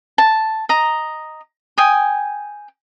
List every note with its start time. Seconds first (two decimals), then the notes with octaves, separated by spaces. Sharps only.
0.18 A5
0.69 D#5 A#5
1.78 G5 G#5 D#6